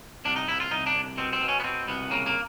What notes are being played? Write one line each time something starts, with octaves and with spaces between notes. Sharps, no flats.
C2 D4
D#4
C2 E4
F4
C2 D#4
D4
C2
B2 C4
C4
B2
C#4
B3
B2 C4
C2 B3
C#3 A#3
A#3